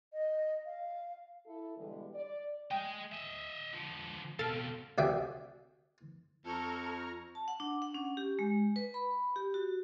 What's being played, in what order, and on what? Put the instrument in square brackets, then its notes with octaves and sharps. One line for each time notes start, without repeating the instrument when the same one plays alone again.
[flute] D#5
F5
[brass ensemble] E4 A4
B2 D3 E3 G3 G#3
D5
[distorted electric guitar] G#4 D#5 [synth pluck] G5
[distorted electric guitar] D#5 E5
D3 F3
[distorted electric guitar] B2 C4 [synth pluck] A4 F5 A6
[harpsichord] C2 F#4 D5 E5 G5 G#5
[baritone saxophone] F2 [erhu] A4 [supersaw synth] A#5 C#6 F6
[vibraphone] A5
F#5
D4
F#5
C#4
G4
G#3
B4
B5
G4
F#4